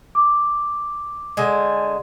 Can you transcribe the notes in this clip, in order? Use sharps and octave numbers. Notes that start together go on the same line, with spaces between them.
D6
D3 G#3 G#5